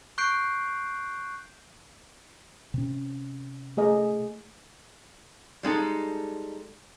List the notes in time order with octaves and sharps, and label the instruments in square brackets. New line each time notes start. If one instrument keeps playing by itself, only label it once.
[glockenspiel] C#6 F#6 G6 C7 D7
[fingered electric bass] C3 C#4
[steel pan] A3 G#4 D#5
[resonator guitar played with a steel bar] G3 G#3 D#4 A4